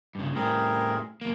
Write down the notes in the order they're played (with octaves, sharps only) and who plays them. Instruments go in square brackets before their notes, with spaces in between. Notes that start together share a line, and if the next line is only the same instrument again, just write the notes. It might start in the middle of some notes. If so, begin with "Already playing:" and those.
[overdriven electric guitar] G2 C#3
[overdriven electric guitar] A2 G3 [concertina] C4 G#4 A#4
[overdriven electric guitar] F#2 A#3